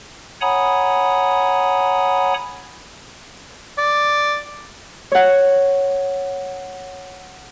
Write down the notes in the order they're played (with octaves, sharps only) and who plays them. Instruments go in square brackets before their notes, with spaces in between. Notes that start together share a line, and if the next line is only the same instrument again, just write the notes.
[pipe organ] C#5 F#5 G#5 A#5 B5 D#6
[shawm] D5
[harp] C#5 F#5